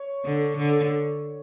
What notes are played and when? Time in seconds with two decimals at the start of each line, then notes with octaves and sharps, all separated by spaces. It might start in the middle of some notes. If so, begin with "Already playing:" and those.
Already playing: C#5
0.25 D3
0.57 D3